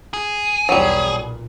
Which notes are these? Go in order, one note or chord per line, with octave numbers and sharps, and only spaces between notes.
G#4
B1 E2 F#3 G3
A#2